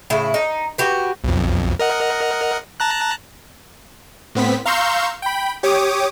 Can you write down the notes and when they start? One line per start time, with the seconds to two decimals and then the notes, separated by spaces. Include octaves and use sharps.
0.10 A2 C#3 E4
0.34 D#4
0.78 F#4 G4 B4
1.24 B1 F2
1.79 A#4 D#5 F#5
2.80 A5 A#5 F#6
4.35 A2 B3 C4 B6
4.66 F5 A#5 C6 C#6 E6 G6
5.22 G5 B5
5.63 G4 C#5 D6 D#6